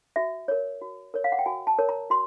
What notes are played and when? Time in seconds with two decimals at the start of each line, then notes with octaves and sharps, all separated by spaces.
0.16 F#4 E5
0.48 A#4 C#5
0.82 F#4
1.14 A#4 C#5
1.24 F5
1.32 F#5
1.39 G5
1.46 F#4 G#5
1.67 A5
1.79 A#4 C#5
1.89 A#5
2.10 F#4 C6